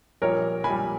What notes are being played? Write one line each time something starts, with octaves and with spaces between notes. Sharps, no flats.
A#1 A#2 G3 A#4 C#5
A#1 A#2 G3 G#5 B5